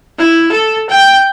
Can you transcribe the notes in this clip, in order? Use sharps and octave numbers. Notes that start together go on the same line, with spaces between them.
E4
A4
G5